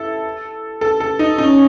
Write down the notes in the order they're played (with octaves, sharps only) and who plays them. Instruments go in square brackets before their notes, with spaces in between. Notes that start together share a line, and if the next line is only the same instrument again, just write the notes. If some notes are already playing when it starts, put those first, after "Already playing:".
Already playing: [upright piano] E4 A4
A4
A4
D#4
[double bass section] C#4 [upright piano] D#4